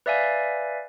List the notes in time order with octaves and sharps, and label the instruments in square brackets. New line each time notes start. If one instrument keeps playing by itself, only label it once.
[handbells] B4 D5 E5 F5 G#5